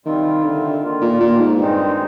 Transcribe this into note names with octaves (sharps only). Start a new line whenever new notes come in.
C3 D#3 G3 C4 F4
D3
D#3 A#3 F4
A#2
A#2
G#2
G2 D#3 G#3 C4 D#4